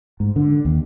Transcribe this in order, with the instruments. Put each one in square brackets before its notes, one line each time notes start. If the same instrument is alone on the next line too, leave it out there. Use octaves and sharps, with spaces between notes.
[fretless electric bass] G#2
D3
D#2